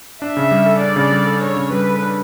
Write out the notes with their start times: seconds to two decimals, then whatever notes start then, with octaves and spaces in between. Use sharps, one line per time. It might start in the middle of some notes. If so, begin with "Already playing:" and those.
0.21 D4 E5
0.37 C#3
0.51 G3
0.66 A4
0.81 D4 D5
0.96 C#3
1.12 G3
1.26 A4
1.42 D4 C#5
1.56 C#3
1.71 G3 B4
1.87 A4
2.03 D4